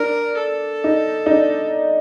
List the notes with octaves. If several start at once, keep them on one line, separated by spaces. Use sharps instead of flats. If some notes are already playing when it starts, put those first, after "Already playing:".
Already playing: D4 A#4
A4
D#4
D#4
D4